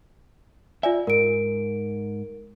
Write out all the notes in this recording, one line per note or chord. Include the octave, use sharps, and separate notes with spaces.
F4 D5 E5 G#5
G#2 A#4 D7